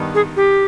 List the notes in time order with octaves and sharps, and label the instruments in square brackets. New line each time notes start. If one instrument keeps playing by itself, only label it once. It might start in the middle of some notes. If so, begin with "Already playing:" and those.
Already playing: [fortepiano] G2 D#3 B3 D#4
[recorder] G#4
G4